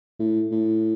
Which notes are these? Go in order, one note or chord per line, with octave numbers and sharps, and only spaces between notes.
A2
A2